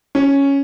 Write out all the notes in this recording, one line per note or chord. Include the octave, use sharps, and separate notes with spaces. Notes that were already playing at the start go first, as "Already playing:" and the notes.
C#4